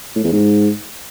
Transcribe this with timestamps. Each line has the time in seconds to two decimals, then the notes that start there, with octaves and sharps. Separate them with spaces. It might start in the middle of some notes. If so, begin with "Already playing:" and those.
0.16 A2
0.24 E2
0.32 G#2